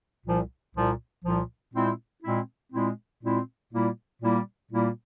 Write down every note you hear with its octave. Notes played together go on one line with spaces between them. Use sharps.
C2 A#2 F3
C2 A#2 F3
C2 A#2 F3
A#2 G#3 C4 E4
A#2 G#3 C4 E4
A#2 G#3 C4 E4
A#2 G#3 C4 E4
A#2 G3 A#3 E4
A#2 G3 A#3 E4
A#2 G3 A#3 E4